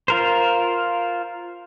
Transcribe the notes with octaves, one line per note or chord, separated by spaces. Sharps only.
F4 A#4 C5